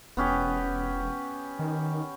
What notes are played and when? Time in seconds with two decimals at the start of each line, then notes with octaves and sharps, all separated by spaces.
0.17 E1 B3 C#4 G4
1.59 D#3